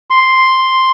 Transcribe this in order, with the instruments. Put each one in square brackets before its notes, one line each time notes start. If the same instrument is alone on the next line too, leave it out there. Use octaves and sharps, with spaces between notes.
[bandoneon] C6